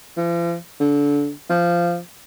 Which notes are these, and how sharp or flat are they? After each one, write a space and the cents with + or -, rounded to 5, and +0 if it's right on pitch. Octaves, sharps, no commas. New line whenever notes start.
F3 -45
D3 -25
F3 -15